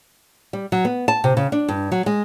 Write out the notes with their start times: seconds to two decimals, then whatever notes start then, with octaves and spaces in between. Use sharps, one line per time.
0.53 G3
0.72 F#3
0.85 B3
1.08 A5
1.24 C3
1.37 C#3
1.52 D4
1.68 G2
1.92 F#3
2.06 G#3